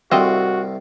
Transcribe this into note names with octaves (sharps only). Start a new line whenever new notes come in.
C2 A2 C4 F4 F#4 D#5